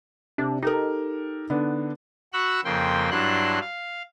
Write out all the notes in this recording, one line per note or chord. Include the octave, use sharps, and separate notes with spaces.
C3 D4
D#4 G4 A4 A#4
D3 B3 D4
F#4 F#5 B5 C#6 E6 F#6
F2 C#3 A#3 G5 C6
G2 F#3 D4 E4 C6 F#6
F5